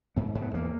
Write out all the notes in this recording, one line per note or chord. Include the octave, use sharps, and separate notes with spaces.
G#2 B3
G#2
B3
E2 A#3